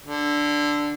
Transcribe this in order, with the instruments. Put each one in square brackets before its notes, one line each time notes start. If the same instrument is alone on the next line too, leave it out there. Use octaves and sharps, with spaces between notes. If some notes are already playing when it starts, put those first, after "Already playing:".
[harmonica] D3